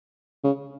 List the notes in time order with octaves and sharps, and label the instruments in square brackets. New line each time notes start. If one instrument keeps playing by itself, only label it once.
[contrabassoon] C#3